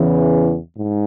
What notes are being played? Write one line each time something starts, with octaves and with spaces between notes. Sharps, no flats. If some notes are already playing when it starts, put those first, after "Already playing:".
Already playing: E2 C#3 E3
G#2